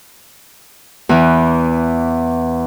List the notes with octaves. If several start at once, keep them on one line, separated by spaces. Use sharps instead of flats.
E2 E3